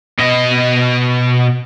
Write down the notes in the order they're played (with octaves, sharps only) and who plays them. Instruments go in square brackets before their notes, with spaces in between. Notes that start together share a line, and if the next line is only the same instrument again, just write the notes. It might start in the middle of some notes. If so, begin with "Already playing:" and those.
[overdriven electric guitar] B2 D#5